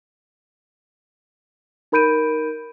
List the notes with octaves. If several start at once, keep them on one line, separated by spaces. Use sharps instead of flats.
D#4 A#4 B5 G6 D7 D#7